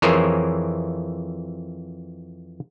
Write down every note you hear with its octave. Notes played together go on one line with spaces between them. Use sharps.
F2 E3 G#4 A#4 C5 C#5